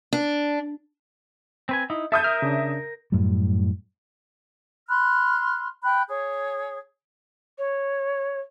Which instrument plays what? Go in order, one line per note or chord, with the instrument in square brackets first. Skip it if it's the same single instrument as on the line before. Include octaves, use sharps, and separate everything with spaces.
[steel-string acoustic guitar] D4
[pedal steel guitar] C4 B4 G#5
D#4 E4
[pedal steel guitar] A4 [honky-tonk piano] E5 D#6 G6
[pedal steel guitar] A#4 [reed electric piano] F6
[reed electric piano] C#3 D4
[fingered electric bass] F#2 A2 G3
[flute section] B5 C6 F6 F#6
G5 B5 F#6
G#4 C#5
[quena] C#5